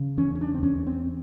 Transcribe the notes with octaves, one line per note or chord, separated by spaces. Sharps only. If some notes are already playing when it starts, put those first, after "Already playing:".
Already playing: C#3
E2 C#4
C#4
D4
C4
E2 C#4
C4